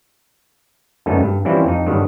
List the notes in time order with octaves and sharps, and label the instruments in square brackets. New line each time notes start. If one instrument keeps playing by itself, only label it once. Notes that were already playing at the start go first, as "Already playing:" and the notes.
[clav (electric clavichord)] F#2 D3 A3 B3 C#4 D#4
G2
E3 F3 G3 C4 C#4 E4
F2 D#4
G2 D3 D#3 F#3